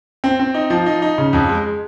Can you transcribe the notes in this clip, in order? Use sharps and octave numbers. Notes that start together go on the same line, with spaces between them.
C4
C4
D#4
F3
D#4
D#4
C#3
F2
G#3